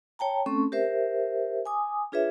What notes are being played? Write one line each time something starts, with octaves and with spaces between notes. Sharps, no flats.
C#5 G5 A5 A#5
A3 C4 C#4 A4 C6 C#6
G4 A#4 C5 E5
G#5 D6 D#6
D4 F4 G#4 B4 C#5 E5